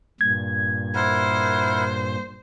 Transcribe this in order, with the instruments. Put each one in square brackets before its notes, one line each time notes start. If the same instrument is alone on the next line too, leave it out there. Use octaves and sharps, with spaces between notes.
[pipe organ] G2 A#2 [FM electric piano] G#6
[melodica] E4 A#4 F#5 [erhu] C5